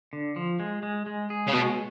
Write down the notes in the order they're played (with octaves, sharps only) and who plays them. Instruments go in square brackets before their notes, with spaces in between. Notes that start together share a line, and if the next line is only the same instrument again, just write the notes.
[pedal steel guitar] D3
F3
G#3
G#3
G#3
G#4
[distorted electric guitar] C#3
[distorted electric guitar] B2 [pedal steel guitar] G#3